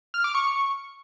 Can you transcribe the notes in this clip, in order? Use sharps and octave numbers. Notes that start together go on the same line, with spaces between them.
F6
D6
C#6